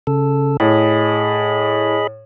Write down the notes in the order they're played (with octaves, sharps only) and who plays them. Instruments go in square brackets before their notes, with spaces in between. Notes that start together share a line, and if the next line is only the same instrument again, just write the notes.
[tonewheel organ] C#3 A4
[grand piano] A2 [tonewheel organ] G#4 D#5 B5